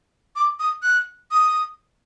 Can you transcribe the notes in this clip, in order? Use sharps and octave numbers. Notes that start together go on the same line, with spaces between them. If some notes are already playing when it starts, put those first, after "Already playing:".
D6
D#6
F#6
D#6